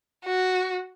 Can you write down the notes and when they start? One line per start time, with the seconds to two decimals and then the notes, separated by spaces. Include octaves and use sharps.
0.25 F#4